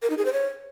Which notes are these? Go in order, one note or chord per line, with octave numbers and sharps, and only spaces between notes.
A#4
D#4
G#4
C5
C#5